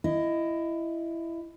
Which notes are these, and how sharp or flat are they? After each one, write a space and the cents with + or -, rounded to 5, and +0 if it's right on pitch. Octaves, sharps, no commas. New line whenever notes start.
E4 +15 D#5 +0